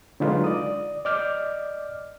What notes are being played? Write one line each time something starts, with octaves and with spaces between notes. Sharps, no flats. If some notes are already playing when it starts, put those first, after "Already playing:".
D3 F#3 G#3 D#4 F4 B4
D5 D#6
D5 D#5 D6 F6 G6